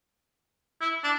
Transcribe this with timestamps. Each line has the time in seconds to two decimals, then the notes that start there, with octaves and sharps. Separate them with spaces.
0.81 E4
1.04 D4